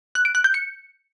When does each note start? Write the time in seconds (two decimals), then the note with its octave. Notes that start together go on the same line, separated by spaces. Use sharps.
0.15 F#6
0.25 D7
0.35 F#6
0.44 G6
0.54 C#7